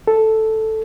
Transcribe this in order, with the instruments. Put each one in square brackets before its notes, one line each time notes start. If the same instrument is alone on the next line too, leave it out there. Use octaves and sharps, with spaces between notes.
[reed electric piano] A4